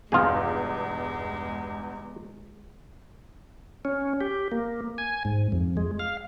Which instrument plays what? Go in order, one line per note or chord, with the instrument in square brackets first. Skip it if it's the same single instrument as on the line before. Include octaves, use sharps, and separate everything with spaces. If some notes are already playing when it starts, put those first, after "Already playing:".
[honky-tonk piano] B1 E2 G2 [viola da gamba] G#3 [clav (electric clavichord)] F4 G#4
[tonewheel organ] C#4
G4
A#3
G#5
G#2
F2
G#3
F5